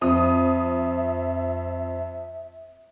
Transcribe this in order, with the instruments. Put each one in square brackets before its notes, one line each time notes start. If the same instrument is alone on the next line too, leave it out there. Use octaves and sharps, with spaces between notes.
[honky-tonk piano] F2 D#6 [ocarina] E5